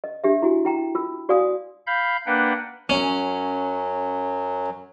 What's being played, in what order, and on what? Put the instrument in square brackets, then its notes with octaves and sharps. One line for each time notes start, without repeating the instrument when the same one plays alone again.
[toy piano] D#5
D4 G4 E5
E4 F#4 G#5
E4 G5 A#5
F4 E6
F#4 D5 F5 G#5 D#6
[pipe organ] F5 B5 G6
A#3 D4 B4 F#5 G5
[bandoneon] F#2 F#3 [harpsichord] C#4